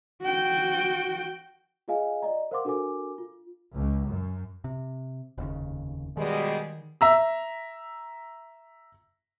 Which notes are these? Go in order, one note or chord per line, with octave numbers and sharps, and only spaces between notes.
F#4 G5
F4 G#4 D#5 F5 G#5
D5 D#5 A#5
A#4 C5 F5 F#5 C6 D6
D4 F#4 A4 A#4 G#5 D6
F4
C#2
F#2
C3
F1 D#2 C#3
B2 D#3 G3 G#3
E5 A#5 E6